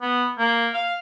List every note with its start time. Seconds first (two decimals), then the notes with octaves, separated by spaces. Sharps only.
0.02 B3
0.39 A#3
0.74 F5